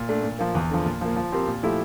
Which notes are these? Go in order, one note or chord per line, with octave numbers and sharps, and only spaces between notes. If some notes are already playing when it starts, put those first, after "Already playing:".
Already playing: A#2
A3 D4
A#2
F3 A#3
E2
D3 F3
A#2
F3 A#3
F3
C4 G4 A#4
A#2
F3 A3 E4 G4